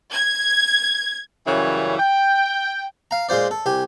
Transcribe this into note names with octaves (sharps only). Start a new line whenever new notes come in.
G#6
F#2 C#3 E3 G3 C#5
G5
F5 A#5
A#2 G#3 F4 C5 D5
A4
C2 G4 G#5